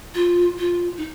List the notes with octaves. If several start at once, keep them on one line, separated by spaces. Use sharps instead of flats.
F4
F4
D#4